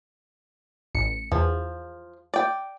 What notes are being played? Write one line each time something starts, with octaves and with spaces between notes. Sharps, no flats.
A1 C#7
E2 F3
D5 G5